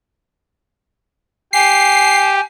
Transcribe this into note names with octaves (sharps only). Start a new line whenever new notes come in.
G4 G#5 C7